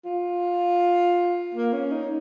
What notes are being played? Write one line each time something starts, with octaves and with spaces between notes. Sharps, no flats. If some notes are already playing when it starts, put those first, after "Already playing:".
F4
A#3
C#4
D#4